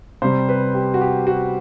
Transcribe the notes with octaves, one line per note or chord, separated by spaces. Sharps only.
C3 G3 C5
B4
G4
F#4
G4
F#4